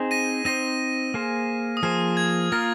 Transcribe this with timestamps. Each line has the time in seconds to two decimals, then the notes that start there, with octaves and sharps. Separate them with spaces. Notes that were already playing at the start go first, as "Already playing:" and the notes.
Already playing: C4 D#4 G#4 C5
0.11 A#6 D#7
0.45 C4 D#4 C5 A#6 D#7
1.14 A#3 G#4 C5
1.77 D#6
1.83 F3 A#3 G#4 C5 F6
2.17 G#6
2.52 A#3 F4 A#4 A#6